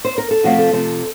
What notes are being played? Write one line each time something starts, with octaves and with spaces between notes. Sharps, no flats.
C5
A#4
A4
C3 F3 A3 C4 F#4
A4
C3 F3 A3 C4